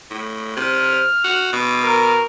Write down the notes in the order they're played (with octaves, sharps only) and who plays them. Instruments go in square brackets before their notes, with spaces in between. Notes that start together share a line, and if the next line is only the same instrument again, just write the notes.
[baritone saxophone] A2
[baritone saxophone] C3 [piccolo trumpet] F6
[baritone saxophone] F#4
B2
[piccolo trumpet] A#4